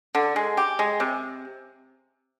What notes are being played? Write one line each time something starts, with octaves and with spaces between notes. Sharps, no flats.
D3
G#3
G4
G#3
C3